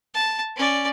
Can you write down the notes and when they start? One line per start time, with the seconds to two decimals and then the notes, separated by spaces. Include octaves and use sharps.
0.15 A5
0.56 C#4 D5